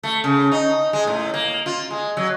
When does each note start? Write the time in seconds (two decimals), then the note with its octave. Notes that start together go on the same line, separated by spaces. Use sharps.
0.03 A3
0.24 C#3
0.52 D#4
0.93 G#3
1.07 A2
1.34 A#3
1.66 F4
1.91 G#3
2.17 F#3